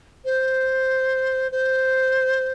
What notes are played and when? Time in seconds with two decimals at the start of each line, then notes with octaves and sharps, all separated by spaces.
0.25 C5
1.52 C5